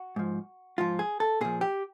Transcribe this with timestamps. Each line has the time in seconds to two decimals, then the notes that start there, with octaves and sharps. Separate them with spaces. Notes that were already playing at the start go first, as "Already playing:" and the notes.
Already playing: F#4
0.16 G#2 F3
0.78 G#2 F3 F4
0.99 G#4
1.20 A4
1.41 A#2 F3 G#4
1.61 G4